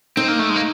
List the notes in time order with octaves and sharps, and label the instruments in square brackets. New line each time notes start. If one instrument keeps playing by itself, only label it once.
[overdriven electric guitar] C4 [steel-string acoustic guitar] D#4
[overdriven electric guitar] A#3
A3
G#3
A#3